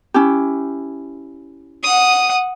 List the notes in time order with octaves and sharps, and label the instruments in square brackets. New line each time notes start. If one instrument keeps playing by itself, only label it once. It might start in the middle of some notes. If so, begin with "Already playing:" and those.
[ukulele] C#4 E4 G4
[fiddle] F#5 D#6